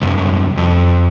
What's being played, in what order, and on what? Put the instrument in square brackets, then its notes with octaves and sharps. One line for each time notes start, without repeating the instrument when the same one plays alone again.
[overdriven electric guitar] C2 F#2
F2